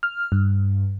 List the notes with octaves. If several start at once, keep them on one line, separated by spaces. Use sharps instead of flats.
F6
G2